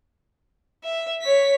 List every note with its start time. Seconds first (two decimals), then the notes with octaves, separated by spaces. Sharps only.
0.84 E5
1.22 C#5 B6